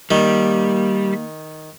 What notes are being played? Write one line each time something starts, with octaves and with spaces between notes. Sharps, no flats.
D#3 G3 A#3